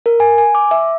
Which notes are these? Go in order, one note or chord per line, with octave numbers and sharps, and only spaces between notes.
A#4
G#5
G#5
D6
E5